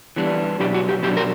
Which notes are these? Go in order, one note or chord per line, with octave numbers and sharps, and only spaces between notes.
E3 G3 B3 D4
B2 F#3 B3 D4 G4
F#4
G4
B2 F#3 B3 D4 G4
A#4